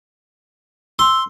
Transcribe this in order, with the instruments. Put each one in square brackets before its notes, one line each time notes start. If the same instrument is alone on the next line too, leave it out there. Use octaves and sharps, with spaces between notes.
[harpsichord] C6 [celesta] E6